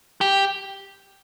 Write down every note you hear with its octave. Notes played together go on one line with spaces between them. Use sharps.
G4